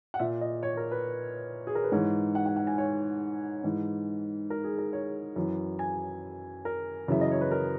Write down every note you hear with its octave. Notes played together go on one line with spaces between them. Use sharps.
F#5
A#2 E5
D#5
C#5
A#4
B4
G#4
A#4
B4
G#2 E3 C#5
F#5
F#5
F#5
G#5
C#5
G#2 E3
A#4
G#4
A#4
C#5
F#2 E3
G#5
A#4
F#2 C#3 E3 E5
D#5
C#5
B4
A#4